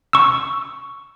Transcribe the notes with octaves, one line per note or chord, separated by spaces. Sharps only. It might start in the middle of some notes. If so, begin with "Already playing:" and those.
C#6 E6